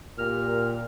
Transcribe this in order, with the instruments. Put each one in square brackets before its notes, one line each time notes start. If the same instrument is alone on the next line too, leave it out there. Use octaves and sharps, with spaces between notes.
[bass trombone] A#2 [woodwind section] G4 A#4 F6